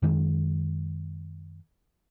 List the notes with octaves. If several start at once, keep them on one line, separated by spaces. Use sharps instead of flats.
F#2 D#3 G#3